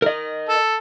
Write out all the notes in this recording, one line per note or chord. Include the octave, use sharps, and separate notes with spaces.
A#4 D#5
A4